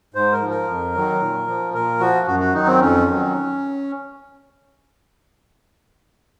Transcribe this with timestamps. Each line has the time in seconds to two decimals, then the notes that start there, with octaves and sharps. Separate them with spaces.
0.14 G#2 C5
0.32 A#4
0.42 F3
0.50 A#4
0.68 F2
0.94 D#3 F#3
1.20 A#2
1.48 F3
1.74 A#2 A#4
2.00 F3 F#4
2.26 F#2 F#4
2.40 F#4
2.54 D#3 F#3 D#4
2.66 C4
2.80 F2 C#4
3.06 D#3 F#3